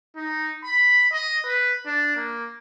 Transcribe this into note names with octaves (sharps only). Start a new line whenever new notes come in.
D#4
B5
D#5
B4
D4
A#3